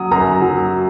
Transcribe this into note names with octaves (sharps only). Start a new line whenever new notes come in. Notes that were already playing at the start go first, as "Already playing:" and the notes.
Already playing: F#3 D#6
F#2 A#5
F#3